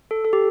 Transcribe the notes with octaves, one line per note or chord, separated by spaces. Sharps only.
A4
A4
G4